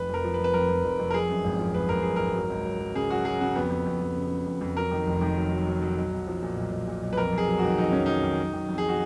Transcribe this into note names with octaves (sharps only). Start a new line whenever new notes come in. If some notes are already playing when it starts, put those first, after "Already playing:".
Already playing: F1 B4
F2 A#4
F3
B4
F2
B4
F2 A#4
F2
F1
F2
A#4
F3 G#4
F#2
G#1
F3
G#1 B4
G#1 A#4
F#2 G#4
G#1 A#4
F#3
C#2
F#3
F#3
C#3 G#4
F#3 F#4
F#3 G#4
C#3 F#4
F2 B3
F2
F2
F2
C#3
C#3
F2
F2
F#3 A#4
D#3
F1
D#3
F#3
F#3
F#3
F#3
B1
B1
F3
A#2
B1
B1
A#2
B1
B4
F2 A#4
F2 G#4
F#3
F#4
D#3
F2 D#4
F2 C#4
D#3 D#4
D#3
F#3
D#3
F2
G#4
F#4